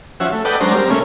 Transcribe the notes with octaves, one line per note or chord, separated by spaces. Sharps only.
F3 C#4 F#4 E5
A3
A4 B4 D5 D#5 F#5 G5
F#3 G#3 C#4 D4 C5 A#5
G3 C4 A#4
C#3 A3 A#3 C#4